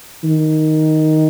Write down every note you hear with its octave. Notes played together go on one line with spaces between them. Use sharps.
D#3